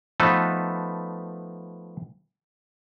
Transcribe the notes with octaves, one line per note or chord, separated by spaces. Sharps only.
F3 A3 B3 D#4 A4 B4